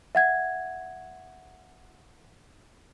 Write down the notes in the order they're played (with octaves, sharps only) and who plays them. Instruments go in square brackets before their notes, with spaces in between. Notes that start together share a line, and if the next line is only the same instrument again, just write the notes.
[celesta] E5 F#5 G#6